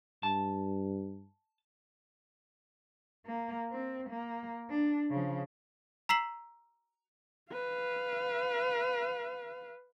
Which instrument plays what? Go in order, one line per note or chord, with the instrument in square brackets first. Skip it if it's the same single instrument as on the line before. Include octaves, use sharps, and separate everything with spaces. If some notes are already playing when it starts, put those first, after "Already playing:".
[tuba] G2 [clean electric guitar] A5
[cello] A#3
C4
A#3
D4
C#3 F3
[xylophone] A#5 E6 B6 C7 E7 F#7
[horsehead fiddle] B4 F5